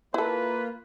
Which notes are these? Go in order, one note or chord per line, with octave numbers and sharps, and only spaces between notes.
A#3 E4 F4 A4 B4